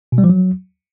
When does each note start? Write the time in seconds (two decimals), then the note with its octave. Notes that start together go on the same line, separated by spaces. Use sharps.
0.12 B2
0.18 G3
0.24 F3
0.29 F#3